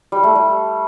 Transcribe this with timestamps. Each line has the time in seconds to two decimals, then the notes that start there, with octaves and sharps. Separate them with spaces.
0.12 G3
0.23 A3
0.35 G3